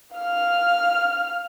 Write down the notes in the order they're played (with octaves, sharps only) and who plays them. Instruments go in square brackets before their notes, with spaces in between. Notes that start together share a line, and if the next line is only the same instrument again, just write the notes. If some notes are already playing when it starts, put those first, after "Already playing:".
[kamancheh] F5 F6